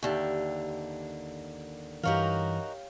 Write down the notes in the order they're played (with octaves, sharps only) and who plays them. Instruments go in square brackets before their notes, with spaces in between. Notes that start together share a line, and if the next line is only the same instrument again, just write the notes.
[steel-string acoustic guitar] D#2 D3 [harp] G4 E5
[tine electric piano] G2 E3 [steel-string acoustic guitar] D#4 F#4 A#4 [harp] G4 C#5 F5